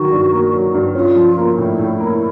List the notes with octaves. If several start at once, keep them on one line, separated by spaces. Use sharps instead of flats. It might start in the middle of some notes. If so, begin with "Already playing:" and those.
Already playing: D#3 F#3 F#4
G2
A#3
F#3
G2
C#4 F4
F3
A#3
A2 E4
A2
A#3